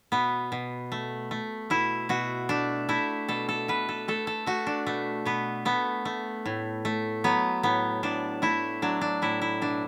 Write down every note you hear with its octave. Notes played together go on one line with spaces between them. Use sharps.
B2 B3
B2
A3
A3
B2 E4
B2 F#4
A3 D4
A3 E4
B2 A4
A4
B2 B4
A4
A3 A4
A4
A3 F#4
D4
B2 A3
B2 B3
A3 B3
A3
A2
A3
F#3 B3
A2 B3
A2 D4
A3 E4
F#3 D4
D4
A2 E4
E4
B2 D4